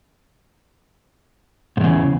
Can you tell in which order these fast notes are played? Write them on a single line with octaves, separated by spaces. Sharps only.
G#2 E2 C#3